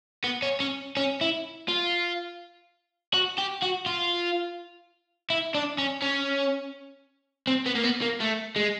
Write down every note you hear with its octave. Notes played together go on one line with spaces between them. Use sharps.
B3
C#4
C#4
C#4
E4
F4
F#4
G4
F#4
F4
E4
D4
C#4
C#4
C4
B3
A#3
B3
A#3
A3
G#3